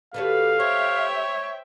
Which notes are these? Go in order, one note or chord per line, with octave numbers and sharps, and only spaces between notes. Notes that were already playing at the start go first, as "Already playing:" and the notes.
D3 F#4 G4 A4 B4 C#5 F5
G4 C5 C#5 E5 G5